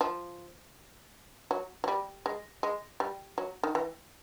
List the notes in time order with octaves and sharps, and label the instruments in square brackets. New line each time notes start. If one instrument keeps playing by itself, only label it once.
[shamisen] F3
F#3
F#3
G3
G#3
G#3
G3
F#3
D#3
E3